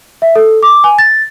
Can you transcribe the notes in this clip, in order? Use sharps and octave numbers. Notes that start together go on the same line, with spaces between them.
E5
A4
D6
G#5
A6